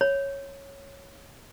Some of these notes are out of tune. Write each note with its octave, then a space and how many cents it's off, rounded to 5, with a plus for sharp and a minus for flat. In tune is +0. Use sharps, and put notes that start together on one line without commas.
C#5 -5 B5 +5